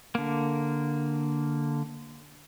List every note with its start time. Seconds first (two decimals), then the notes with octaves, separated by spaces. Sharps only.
0.15 D3 A#3